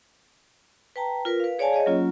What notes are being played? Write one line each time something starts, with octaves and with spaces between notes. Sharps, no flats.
B4 G5 A5 A#5
F4 A#4 B4
B4 F5
G#4 C#5 D5 F5 G#5 A5
G#4 C#5 D#5
F#3 A#3 C#4 F4